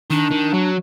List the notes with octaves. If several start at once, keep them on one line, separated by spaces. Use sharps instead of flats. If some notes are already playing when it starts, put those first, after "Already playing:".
D#3 D4
D#3
F#3